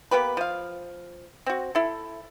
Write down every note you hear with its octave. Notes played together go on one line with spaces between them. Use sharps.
A#3 B3 G4 B4
F3 F5
C4 F#4
E4 A4